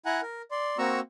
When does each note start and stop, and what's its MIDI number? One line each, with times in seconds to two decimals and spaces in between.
0.06 0.21 64
0.06 0.21 78
0.06 0.21 80
0.06 0.21 82
0.06 0.21 90
0.22 0.42 70
0.51 0.77 74
0.51 0.77 84
0.78 1.00 58
0.78 1.00 60
0.78 1.00 66
0.78 1.00 82
0.78 1.00 85
0.78 1.00 88